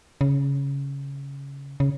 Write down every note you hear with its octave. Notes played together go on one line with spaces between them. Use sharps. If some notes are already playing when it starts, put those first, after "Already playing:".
C#3
C#3